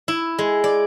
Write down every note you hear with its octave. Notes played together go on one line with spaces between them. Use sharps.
E4
G#3
D5